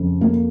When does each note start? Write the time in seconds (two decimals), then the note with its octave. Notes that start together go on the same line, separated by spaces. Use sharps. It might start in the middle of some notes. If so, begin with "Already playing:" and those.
Already playing: F2 C#3
0.21 A#3